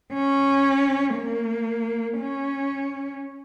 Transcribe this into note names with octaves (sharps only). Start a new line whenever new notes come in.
C#4
A#3
C#4